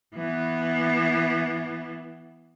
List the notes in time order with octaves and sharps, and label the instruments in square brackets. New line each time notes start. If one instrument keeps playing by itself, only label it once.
[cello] E3 B3